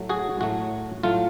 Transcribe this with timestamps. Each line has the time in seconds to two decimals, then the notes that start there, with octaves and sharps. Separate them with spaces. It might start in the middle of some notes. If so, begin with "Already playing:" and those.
Already playing: A2 F#3 A3
0.09 F#4 G#4
0.41 A2 F#3 A3 F#4
1.03 A2 F#3 A3 F4